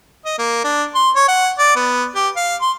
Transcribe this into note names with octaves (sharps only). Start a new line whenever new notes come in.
D#5
A#3
D4
C6
C#5
F#5
D5
B3
G4
F5
C6